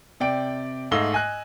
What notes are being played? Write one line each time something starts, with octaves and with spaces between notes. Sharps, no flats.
C3 D5 G5 D7
G#2 A3 D#5 F5 E6 G7
D#5 G#5 F#6